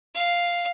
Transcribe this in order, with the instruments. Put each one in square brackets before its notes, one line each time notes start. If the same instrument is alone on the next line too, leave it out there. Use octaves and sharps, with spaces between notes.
[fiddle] F5